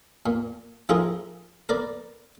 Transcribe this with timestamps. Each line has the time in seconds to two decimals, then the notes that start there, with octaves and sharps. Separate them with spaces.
0.26 A#2
0.89 F3 E4 F4 G#4 A#4
1.69 A#4 B4 D5